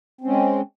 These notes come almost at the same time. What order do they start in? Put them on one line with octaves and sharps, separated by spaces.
C4 C#4 G#3